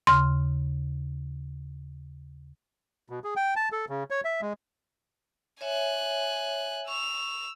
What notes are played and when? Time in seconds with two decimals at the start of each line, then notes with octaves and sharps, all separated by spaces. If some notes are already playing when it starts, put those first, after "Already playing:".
0.07 D#2 C#3 C6 F6
3.10 B2
3.24 G#4
3.36 G5
3.56 A5
3.72 A4
3.89 C#3
4.10 C#5
4.25 E5
4.41 G#3
5.61 C#5 E5 G#5 F#6
6.88 C#6 E6 F7